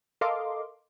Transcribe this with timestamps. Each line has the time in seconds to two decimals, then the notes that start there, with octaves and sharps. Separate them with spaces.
0.21 A4 A#4 D#5 F5 C6 D6